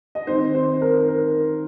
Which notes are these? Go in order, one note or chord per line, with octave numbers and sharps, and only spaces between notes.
D#5
D#3 C4 D#4 C5
C5
A#4
A#4